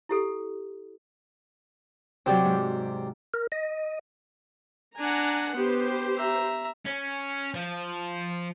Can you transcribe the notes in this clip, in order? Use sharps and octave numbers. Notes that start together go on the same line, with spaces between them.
E4 G4 A4
C3 F#3 C4 G4 D5
G#2 C3
A#4
D#5
D4 F#5 G#5 A#5
B3 G4 B4 C5
E5 A#5
C#4
F3